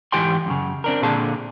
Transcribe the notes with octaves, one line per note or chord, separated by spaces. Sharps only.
G#2 E3 G4 G5 G#5 C6
F#2 A#2 C#3
C4 D4 A#4
A#2 D3 C4 G#4 A5